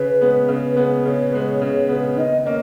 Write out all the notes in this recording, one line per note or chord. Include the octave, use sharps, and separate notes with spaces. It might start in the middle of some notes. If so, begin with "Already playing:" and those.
Already playing: C#3 B4
G#3 B3
C#3
G#3 B3
C#3 C#5
G#3 B3
C#3
G#3 B3
D#3 D#5
A#3 C#4 D#5